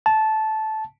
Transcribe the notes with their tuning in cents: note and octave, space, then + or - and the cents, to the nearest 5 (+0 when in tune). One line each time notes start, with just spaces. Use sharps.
A5 -15